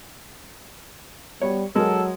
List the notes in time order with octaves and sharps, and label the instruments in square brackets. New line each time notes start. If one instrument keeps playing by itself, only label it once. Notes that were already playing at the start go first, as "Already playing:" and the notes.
[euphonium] G3 [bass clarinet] B3 [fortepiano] C#5
[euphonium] F#3 [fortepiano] G#3 A#4 [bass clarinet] A4